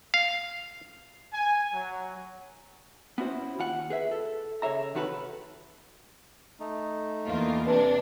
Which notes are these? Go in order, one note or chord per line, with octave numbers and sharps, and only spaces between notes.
F5
G#5
F#3
B3 C#4 E4 F#4 C5
D#2 F4 F#5
G#4 B4 E5
A4
C#3 G#4 C#5 E5 A#5
C3 D#3 F#4 A4 B4
A3 D#4
E2 A#3 F4 A#4
C3 D4 B4 G#5